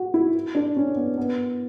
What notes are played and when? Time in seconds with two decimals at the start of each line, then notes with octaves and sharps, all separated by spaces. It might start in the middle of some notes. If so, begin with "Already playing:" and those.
Already playing: F#4
0.14 E4
0.55 D4
0.77 C#4
0.96 B3
1.17 B3